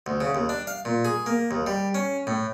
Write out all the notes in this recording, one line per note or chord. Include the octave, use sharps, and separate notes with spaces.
D2
C#3
D#2
D4
F5
A#2
G#4
A#3
D#2
G3
C#4
A2